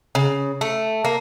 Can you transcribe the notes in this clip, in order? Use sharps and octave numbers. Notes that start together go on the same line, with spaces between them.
C#3
A3
A#3